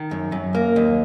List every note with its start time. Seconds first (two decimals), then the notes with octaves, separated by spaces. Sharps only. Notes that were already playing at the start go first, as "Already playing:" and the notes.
Already playing: D#3
0.11 F#2
0.32 F#2
0.55 A#3
0.76 D#2